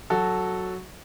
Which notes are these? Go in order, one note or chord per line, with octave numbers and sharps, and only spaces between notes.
F#3 F#4 A4